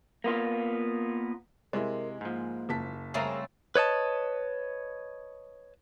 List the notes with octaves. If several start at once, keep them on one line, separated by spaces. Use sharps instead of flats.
A#3 B3 F4
C3 G#3 E4 A#4
G#2 F3 A#3
F#1 A5 B6
C#3 G3 A3 C4 G#4 A#4 A#5
B4 C#5 D#5 A5